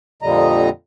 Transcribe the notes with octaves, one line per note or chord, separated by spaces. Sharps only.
F2 A#2 D3 G3 D#5 A#5